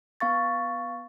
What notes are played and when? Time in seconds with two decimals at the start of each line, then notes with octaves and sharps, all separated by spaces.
0.20 B3 F5 C#6 A6